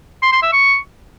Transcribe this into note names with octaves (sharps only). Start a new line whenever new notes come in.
C6
C6
E5
C#6